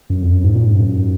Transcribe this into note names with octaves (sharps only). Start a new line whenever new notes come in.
F#2
F2
F#2
G#2
A#2
G#2
F#2